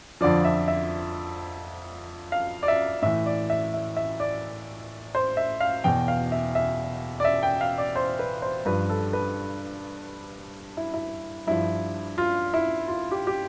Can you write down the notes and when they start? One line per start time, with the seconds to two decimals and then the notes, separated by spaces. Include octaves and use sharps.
0.21 F2 D3 F3 D5
0.45 E5
0.68 E5
2.32 F5
2.63 D5
2.68 E5
3.02 A2 E3 E5
3.26 D5
3.50 E5
3.74 E5
3.96 E5
4.20 D5
5.15 C5
5.37 E5
5.60 F5
5.84 E2 B2 G5
6.08 F5
6.32 E5
6.55 E5
7.20 D5
7.25 E5
7.43 G5
7.61 F5
7.78 D5
7.96 C5
8.19 B4
8.42 C5
8.65 G2 F3 B4
8.90 A4
9.13 B4
10.77 E4
10.94 E4
11.47 G2 F3 E4
12.18 F4
12.54 E4
12.88 F4
13.11 G4
13.27 G4